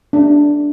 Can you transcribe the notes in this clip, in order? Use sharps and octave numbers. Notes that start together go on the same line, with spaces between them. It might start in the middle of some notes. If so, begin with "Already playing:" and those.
D4